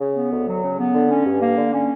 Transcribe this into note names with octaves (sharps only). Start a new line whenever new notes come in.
C#3
B3
D2
F#3
C#3
B3
D3
C#4
G2
A#3
D3
C#4